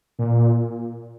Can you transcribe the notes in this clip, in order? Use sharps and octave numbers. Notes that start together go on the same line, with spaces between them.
A#2